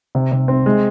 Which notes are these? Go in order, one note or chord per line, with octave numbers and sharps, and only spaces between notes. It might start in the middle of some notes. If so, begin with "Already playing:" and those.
C3
C3
C4
G#3